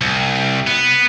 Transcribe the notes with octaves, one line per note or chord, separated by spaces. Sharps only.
C2
B3